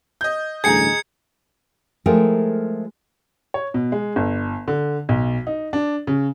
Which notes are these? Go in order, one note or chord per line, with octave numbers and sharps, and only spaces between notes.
D#5 G6
A1 D2 G2 G#4 G#5 A#5 G#6 C#7
F3 G#3 A3 E4 A#4 G5
C#5
B2
G#3
G1
D3
B1
D#4
D4
C#3